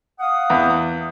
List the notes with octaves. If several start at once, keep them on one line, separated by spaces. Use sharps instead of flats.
F5 F#5 D#6
E2